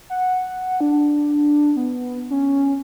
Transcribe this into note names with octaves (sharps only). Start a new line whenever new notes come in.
F#5
D4
B3
C#4